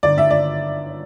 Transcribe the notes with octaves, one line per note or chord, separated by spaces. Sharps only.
G1 D5
E5
D5